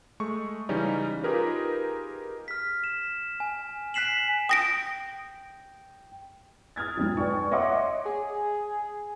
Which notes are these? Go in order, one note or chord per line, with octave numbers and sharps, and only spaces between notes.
G#3 A3 C#6
C#3 E3 G3 C#4 D#4
D#4 F4 G4 G#4 A#4 B4
F6 B6
E7
G#5
G#5 F#6 B6 C7 E7 F#7
G5 D#6 A#6 D7
D#6 F6 G#6 A6
B1 F2 G#2
B4 D5 G5 G#5 C#6
C#5 D#5 E5 F#5 C6 D6
G#4